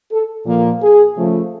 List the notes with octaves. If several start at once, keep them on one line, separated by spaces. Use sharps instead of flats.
A4
A#2 F3 A#3
G#4
C#3 F3 A3